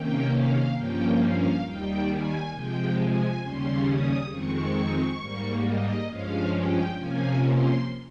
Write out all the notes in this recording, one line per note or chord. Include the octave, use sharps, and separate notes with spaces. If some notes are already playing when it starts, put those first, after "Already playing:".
Already playing: C3 D#3 A#3 C#4 G5
F5
G2 F3 A#3 C#4 G5
F5
D#2 D#3 G3 G5
G#5
C3 F3 G#3 G5
G#5
D#2 C#3 G3 C#4 C6
D#6
F2 D#3 G#3 C4 C#6
G#2 G3 A#3
D#5
G2 F3 G#3 C#4 F5
G5
C3 F3 A#3 C#4 G#5
C6